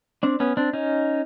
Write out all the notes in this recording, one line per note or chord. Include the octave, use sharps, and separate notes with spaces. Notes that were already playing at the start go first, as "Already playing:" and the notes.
C4 D4
B3 C#4
C4 D4
C#4 D#4